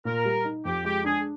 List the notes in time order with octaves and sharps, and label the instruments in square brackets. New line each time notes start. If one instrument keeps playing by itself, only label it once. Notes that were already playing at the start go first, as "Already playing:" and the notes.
[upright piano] A#2 [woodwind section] A#4
[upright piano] G3
D#4
[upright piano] F2 [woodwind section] G4
[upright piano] G#3 [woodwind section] G4
[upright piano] D4 [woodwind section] G#4